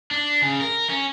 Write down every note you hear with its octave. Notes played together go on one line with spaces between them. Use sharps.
D4
C#3
A#4
C#4